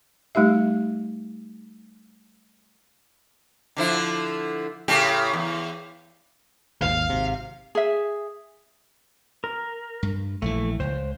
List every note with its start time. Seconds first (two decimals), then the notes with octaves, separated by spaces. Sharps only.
0.35 G3 A3 D#4 G4 E5
3.76 D3 F3 E4
4.88 A2 C#3 G4
5.33 E2
6.82 G#1 D#2 F5
7.09 G#1 C3
7.75 G#4 E5
9.44 A#4
10.03 G2
10.42 A#1 E3 A3
10.80 C#2 C5